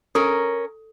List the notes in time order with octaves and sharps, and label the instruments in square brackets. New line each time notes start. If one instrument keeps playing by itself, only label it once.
[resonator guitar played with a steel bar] C#4 A#4 [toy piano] A4